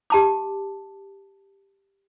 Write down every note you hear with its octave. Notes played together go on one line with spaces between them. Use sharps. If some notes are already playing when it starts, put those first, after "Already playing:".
G4 A5 D6